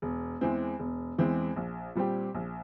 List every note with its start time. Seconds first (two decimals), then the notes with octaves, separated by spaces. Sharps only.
0.02 E1
0.41 E2 E3 G#3 C4
0.79 E1
1.18 E2 E3 G#3 C4
1.56 A#1
1.95 A#2 G3 C4 G4
2.35 A#1